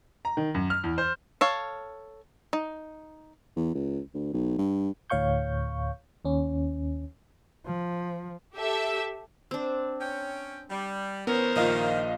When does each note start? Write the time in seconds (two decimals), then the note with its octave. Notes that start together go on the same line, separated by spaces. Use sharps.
0.25 A#5
0.37 D#3
0.54 F#2
0.70 F6
0.83 E2
0.98 C5
1.41 A4 C#5 F5
2.53 D#4
3.56 E2
3.74 C#2
4.14 D2
4.33 B1
4.58 G2
5.10 D2 A2 C#5 F5 C#6 G6
6.25 D#2 C#4
7.66 F3
8.55 G4 A4 E5
9.51 C4 D4
10.00 C#4 C#5 G5
10.70 G3
11.27 E3 B3 C#4 A#4 C5
11.56 A#1 D#3 A#3 F4 D#5 F5